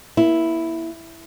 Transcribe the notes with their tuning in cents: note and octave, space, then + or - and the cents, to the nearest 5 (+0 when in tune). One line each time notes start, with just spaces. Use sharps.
A#3 +35 E4 +0